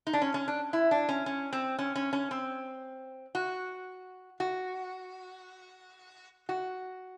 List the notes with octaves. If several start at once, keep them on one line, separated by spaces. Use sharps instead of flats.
D#4
D4
C#4
C#4
D4
E4
D4
C#4
C#4
C4
C#4
C#4
C#4
C4
F#4
F#4
F#4